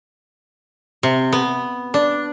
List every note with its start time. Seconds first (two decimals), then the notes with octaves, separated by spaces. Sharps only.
1.03 C3
1.32 B3
1.94 D4